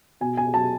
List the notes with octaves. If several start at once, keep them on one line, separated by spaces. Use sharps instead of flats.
B2 G#5
G#5
F#3 A5